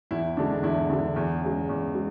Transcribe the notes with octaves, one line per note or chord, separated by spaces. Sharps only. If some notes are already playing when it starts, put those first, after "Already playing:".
E2 E4
D3 G#3 D4
D4
E2 E4
D3 G#3
E2
C#3 G#3
E2
G#3